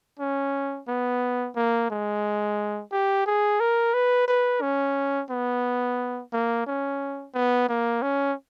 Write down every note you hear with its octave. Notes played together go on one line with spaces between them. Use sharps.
C#4
B3
A#3
G#3
G4
G#4
A#4
B4
B4
C#4
B3
A#3
C#4
B3
A#3
C#4